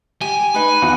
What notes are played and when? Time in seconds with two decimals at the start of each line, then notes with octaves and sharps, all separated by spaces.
0.21 G4 G#5
0.54 D#4 B4
0.82 E2 F#4 F#5